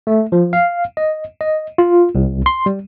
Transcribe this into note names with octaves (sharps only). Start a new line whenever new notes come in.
A3
F3
F5
D#5
D#5
F4
C2
C6
G3